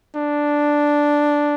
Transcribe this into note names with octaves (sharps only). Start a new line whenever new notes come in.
D4